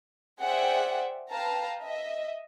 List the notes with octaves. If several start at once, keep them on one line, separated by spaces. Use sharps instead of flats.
G#4 C5 D5 E5 F#5 G5
B4 F5 G5 A5 A#5
D#5 E5